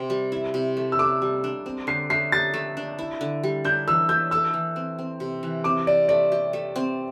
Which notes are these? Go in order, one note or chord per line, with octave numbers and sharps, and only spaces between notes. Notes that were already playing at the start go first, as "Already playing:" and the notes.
Already playing: C3 C4
G3
E4
C3
A3
E6
A4 D6
G3
D4
C4
D3 C7
A3 C7
G4 A6
A3
D4
E4
D3
G3
D4 G6
E3 E6
A3 G6
A4 E6
E3
C4
C4
C3
E3
C4 D6
C3 D5
A3 D5
G4
A3
C4